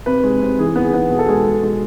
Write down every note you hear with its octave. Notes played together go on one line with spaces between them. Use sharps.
C3 B4
G#3
C3
E3 G#4
B3
G#4
B3
B2 G#4
A4
G#3 G#4
B2
G#3